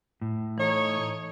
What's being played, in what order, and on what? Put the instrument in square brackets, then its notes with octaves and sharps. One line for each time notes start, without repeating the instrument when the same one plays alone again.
[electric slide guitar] A2
[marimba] E3 [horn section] D#4 A4 C#5